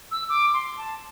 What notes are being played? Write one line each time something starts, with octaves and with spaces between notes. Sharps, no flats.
E6
D6
C6
A5